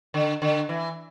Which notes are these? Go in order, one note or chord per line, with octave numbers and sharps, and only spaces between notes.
D3
D3
E3